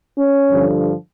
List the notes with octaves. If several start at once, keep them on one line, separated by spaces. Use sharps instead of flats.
C#4
G2 D3 F3